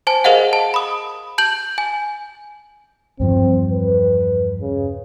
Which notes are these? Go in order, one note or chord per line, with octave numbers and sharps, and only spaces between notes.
C5 G#5 A5
G#4 A#4 C5 D#5 F5 F#5
A5
B5 D#6
A5 G6 F#7
G#5
E2 G2 F3 C4
B4
C#3